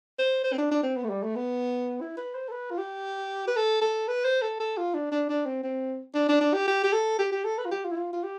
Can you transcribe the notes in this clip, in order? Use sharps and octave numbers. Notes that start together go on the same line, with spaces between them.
C5
C5
C4
D4
D4
C4
B3
A3
G3
A3
B3
E4
B4
C5
A4
B4
F4
G4
B4
A4
A4
B4
C5
A4
A4
F4
D4
D4
D4
C4
C4
D4
D4
D4
G4
G4
G4
A4
G4
G4
A4
B4
F4
G4
F4
E4
F4
F4
G4